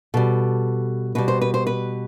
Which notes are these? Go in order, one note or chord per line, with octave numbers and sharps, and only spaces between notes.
B2 G3 A4
B2 G3 B4
C5
B4
C5
B4